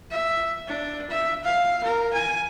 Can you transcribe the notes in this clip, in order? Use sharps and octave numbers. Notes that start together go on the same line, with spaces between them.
E5
D4
E5
F5
A#4
G#5